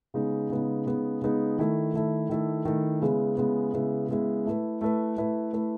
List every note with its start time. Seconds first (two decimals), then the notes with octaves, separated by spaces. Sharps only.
0.14 C#3 G#3 B3 D#4
0.50 C#3 G#3 B3 D#4
0.86 C#3 G#3 B3 D#4
1.22 C#3 G#3 B3 D#4
1.59 D#3 A3 E4 A4
1.94 D#3 A3 E4 A4
2.29 D#3 A3 E4 A4
2.65 D#3 A3 E4 A4
3.02 C#3 G#3 B3 E4
3.37 C#3 G#3 B3 E4
3.74 C#3 G#3 B3 E4
4.09 C#3 G#3 B3 E4
4.46 A3 E4 B4
4.81 A3 E4 B4
5.17 A3 E4 B4
5.53 A3 E4 B4